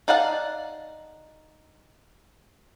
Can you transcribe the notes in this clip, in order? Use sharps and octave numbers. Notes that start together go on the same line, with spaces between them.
D#4 D5 F5 F#5 A5